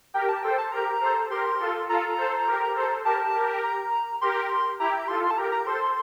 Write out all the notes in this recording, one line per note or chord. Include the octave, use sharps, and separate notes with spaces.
G4 A#4 G5
A5
A4 C5 G5
A5
G4 A#4 A#5
A4 C5
G4 A#4 C6
F4 A4
F4 A4 A#5
A4 C5
G4 A#4
A4 C5
G4 A#4 A5
G4 A#4
A#5
G4 A#4 C6
E4 G4 A#5
F4 A4 C6
C6
A5
G4 A#4 A#5
A#5
A4 C5 C6